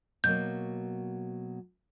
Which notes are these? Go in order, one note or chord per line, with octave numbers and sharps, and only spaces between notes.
B2 F#3 A#3 G6